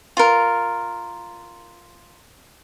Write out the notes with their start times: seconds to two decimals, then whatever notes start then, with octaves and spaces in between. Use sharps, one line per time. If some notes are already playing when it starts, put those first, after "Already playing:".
0.17 F4 A#4